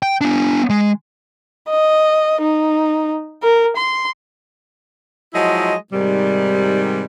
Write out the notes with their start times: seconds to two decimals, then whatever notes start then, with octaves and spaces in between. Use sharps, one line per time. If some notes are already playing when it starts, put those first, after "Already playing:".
0.03 G5
0.21 B3 D4
0.70 G#3
1.70 D#5
2.42 D#4
3.43 A#4
3.77 C6
5.33 F3 F#3 G#3 E4 F#4 D#5
5.92 G#2 C3 D#3 G3